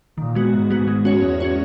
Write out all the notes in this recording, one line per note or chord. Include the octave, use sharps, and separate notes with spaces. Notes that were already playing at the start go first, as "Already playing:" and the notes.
A#2 D#3
G#3 B3 F#4
G#2 D#3
G#3 B3 F#4
G#3
C#4 F#4 C#5
E2 G#3
C#4 F#4 C#5